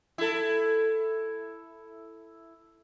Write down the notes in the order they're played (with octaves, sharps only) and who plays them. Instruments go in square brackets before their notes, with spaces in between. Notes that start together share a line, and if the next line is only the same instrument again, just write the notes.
[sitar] E4 A4